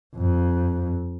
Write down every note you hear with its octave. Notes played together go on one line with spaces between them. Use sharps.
F2